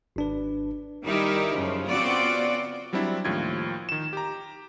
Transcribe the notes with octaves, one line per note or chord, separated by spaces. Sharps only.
G#1 D4 B4
D#3 G3 D#4 E4 G4 A#4
F#2 C#3 F3
C#3 B3 C4 F4 F#4 D5
F#3 G3 C4 D4 E4
D#2 A2 F3 G#6
D#3 E7
G4 A#5